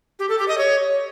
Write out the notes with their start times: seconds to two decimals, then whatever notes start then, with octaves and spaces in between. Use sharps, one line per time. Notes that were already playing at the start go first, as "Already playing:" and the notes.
0.19 G4
0.29 A4
0.38 G4
0.48 D#5
0.58 C#5